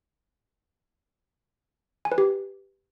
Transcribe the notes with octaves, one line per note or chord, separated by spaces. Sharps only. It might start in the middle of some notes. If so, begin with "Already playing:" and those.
G#5
B4
G4